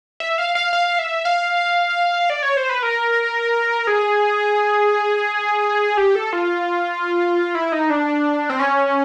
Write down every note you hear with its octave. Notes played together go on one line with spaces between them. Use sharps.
E5
F5
F5
F5
E5
F5
D5
C#5
C5
B4
A#4
G#4
G4
A4
F4
E4
D#4
D4
C4
C#4